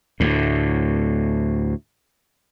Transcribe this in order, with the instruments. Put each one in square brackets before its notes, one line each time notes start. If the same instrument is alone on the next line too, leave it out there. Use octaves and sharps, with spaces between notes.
[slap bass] D2 A2